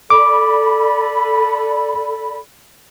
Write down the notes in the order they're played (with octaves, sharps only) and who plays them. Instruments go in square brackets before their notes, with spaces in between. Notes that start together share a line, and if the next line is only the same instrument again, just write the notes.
[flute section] A4 D5 B5 [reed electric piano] D6